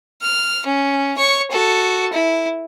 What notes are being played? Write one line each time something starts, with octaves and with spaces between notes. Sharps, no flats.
F6
C#4
C#5 C#6
F#4 A4
E4